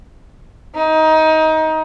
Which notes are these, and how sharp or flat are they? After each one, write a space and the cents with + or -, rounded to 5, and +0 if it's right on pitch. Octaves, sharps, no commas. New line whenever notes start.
D#4 +20